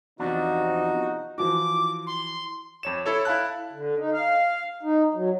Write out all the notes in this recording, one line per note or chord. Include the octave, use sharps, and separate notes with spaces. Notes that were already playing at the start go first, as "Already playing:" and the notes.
E2 C3 F3 C4 D4 D#4 F#4
E3 F3 F#4 D6
C6
F2 C#5 E7
E4 A4 C#5
E4 F5 A5 F#6
D3
D#4
F5
D#4
F#3